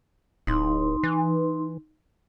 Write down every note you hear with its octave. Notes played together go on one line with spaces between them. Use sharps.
D1 D#4 C6
E3